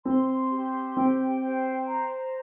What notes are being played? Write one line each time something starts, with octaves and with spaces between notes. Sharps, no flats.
C4 C6
G4
C4 G5
C5
A#5